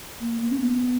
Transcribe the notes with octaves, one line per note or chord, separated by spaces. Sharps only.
A#3
A#3
C#4
B3